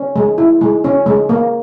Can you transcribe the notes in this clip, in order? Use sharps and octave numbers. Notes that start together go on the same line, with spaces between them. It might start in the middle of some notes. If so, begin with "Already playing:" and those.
Already playing: C#4
G#3
E4
G#3
C#4
G#3
A#3